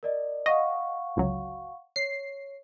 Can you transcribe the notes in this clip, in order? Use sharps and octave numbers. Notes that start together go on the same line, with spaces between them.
A#4 D5 D#5
D#5 F5 F#5 C#6
G1 C#2 F#3
C#5 C7